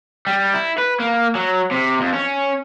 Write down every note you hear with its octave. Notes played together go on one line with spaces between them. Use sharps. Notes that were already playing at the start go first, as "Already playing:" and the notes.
G3
E4
B4
A#3
F#3
C3
F2
C#4